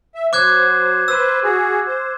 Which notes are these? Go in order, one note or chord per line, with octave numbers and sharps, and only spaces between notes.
E5
F#3 C5 D6 F#6 G#6
B4 C5 E6
F#4 G#4
C5